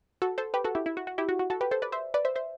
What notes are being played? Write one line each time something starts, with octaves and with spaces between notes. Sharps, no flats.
F#4 A4
A4 C5
G4 B4
F#4 A4
E4 G4
E4
F#4
F#4
E4 G4
F#4
F#4
F#4 A4
G4 B4
A4 C5
B4 D5
C5 E5
B4 D5
C5 E5
C5 E5